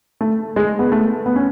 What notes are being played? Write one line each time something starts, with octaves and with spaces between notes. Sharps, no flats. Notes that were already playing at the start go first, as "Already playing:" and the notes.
A3
G#3
B3
A3
B3
C#4